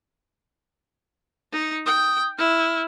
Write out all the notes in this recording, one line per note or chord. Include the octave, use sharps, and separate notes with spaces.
D#4
G5 D#6
E4 F6